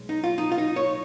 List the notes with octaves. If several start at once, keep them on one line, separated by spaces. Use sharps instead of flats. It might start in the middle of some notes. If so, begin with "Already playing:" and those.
Already playing: B1 G#3
D#4
F4
D#4
F4
D#4
C#5